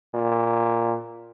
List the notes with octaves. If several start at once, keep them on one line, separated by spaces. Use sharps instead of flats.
A#2